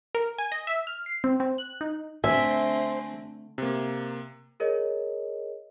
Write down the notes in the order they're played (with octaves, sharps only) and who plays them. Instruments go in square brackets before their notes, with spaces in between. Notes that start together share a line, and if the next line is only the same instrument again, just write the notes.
[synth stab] A#4
G#5
D#5
E5
F6
C7
C4
C4
F#6
D#4
[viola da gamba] D3 A3 C4 [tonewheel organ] C5 [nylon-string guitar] E5 [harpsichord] G#5
[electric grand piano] C3 A#3
[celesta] G#4 A#4 C#5 D#5